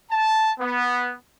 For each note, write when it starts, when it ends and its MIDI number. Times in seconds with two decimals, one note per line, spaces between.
0.11 0.52 81
0.60 1.13 59